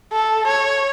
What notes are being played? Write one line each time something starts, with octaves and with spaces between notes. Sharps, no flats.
A4
C#5